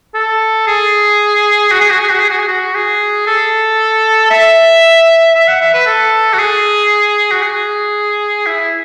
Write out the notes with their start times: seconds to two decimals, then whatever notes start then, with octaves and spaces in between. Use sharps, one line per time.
0.15 A4
0.67 G#4
1.71 F#4
1.81 G#4
1.91 F#4
2.01 G#4
2.10 F#4
2.20 G#4
2.30 F#4
2.39 G#4
2.49 F#4
2.75 G#4
3.27 A4
4.31 E5
5.35 E5
5.48 F#5
5.61 E5
5.74 B4
5.87 A4
6.34 F#4
6.39 G#4
7.31 F#4
7.43 G#4
8.47 E4